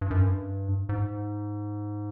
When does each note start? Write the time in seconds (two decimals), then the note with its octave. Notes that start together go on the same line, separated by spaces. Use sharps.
0.01 G2
0.10 F#2
0.21 G2
0.89 G#2